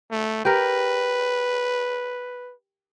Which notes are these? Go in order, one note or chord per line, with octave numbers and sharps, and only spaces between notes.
A3
G4 A#4 B4